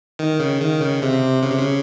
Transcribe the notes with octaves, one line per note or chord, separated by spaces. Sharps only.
D#3
C#3
D#3
C#3
C3
C#3
C3
C#3